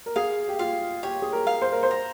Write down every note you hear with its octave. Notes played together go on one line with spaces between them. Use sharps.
A#4
G#4 F5
G4
F4 F5
G4 C#5
G#4
A#4
F5
C5
A#4
C5
A#5